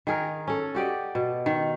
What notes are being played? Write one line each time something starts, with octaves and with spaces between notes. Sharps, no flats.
D#3 G#4 A#4
C#4 A4
F#4 G4 D5 D#5
B2
D#3